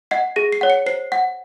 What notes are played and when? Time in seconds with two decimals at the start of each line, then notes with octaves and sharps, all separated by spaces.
0.11 D#5 F#5 C7
0.36 G#4 A#6
0.52 C7
0.61 C#5 F#5
0.70 C#7
0.86 C5 C7
1.12 F#5